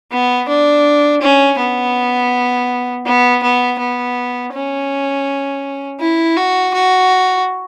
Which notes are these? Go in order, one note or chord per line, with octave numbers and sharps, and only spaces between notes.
B3
D4
C#4
B3
B3
B3
B3
C#4
E4
F#4
F#4